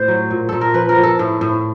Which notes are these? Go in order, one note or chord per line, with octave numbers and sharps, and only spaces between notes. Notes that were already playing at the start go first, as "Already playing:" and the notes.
Already playing: A2 C5
F#3
A#2
A#2 A4
A#4
F3 B4
A#4
F3
A4
A2
A2